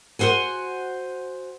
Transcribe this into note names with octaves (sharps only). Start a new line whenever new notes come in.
F#4 G4 C5 F#5 G#5